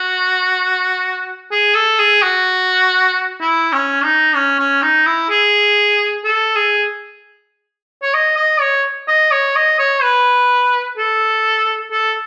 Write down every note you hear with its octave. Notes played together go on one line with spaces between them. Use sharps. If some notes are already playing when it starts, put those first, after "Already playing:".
Already playing: F#4
G#4
A4
G#4
F#4
E4
C#4
D#4
C#4
C#4
D#4
E4
G#4
A4
G#4
C#5
D#5
D#5
C#5
D#5
C#5
D#5
C#5
B4
A4
A4